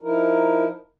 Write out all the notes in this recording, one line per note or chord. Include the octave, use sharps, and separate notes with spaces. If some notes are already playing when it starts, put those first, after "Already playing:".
F3 D#4 E4 A#4